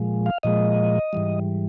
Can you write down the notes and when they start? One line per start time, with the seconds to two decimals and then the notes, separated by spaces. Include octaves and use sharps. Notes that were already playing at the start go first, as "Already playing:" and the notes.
Already playing: A#2 F3 G#3
0.26 F5
0.43 A#2 F3 G#3 D#5
1.13 G#2 E3 G3